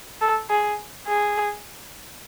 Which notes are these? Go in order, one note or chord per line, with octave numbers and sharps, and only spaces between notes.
A4
G#4
G#4